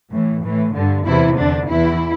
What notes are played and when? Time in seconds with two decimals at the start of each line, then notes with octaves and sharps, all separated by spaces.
0.11 A2 E3
0.43 A2 E3
0.74 G2 D3
1.05 E2 C3 E3 E4
1.37 E2 D3 D4
1.69 E2 E3 E4